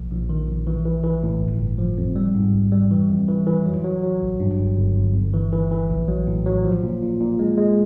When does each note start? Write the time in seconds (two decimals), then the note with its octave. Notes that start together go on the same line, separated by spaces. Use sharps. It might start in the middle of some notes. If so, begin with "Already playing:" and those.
Already playing: A#1
0.11 A#1
0.29 D#3
0.47 A#1
0.67 E3
0.85 E3
1.03 E3
1.23 A2
1.41 G1
1.60 G1
1.78 F3
1.98 F2
2.16 G3
2.35 G#2
2.54 A1
2.72 G3
2.91 E3
3.10 F2
3.29 E3
3.47 E3
3.66 F#3
3.84 F#3
4.03 F#3
4.22 A1
4.40 G2
4.59 G1
4.78 G1
4.96 G1
5.15 G1
5.34 E3
5.52 E3
5.71 E3
5.90 A#1
6.08 F#3
6.27 A2
6.46 F#3
6.65 F3
6.83 A#2
7.03 A#2
7.20 A#2
7.39 G#3
7.58 G#3